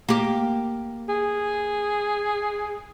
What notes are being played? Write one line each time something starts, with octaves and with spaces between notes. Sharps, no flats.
A#3 G4
G#4